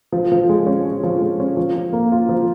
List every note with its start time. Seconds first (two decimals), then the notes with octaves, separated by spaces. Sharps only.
0.12 F3
0.32 F3
0.49 G#3
0.67 C#4
0.85 F3
1.03 F3
1.21 G#3
1.40 C#4
1.57 F3
1.76 F3
1.93 A#3
2.12 F4
2.29 F3